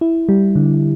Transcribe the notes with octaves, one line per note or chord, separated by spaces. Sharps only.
E4
G3
D3